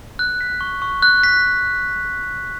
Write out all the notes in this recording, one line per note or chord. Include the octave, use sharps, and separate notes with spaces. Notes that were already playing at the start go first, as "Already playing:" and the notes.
F#6
B6
C#6
C#6
F#6
B6